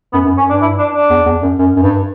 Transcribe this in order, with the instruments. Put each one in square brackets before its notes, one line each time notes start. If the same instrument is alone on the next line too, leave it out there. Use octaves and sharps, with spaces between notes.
[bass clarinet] F#2 [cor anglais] B3
[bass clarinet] F#2
[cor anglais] C#4
[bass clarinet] G2 [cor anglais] D4
[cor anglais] E4
D4
D4
[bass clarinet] E2
E2
F#2
F#2
F#2
G2